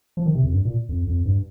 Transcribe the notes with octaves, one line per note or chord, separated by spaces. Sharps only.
F3
D#3
C3
F2
G2
A#2
F2
F2
G2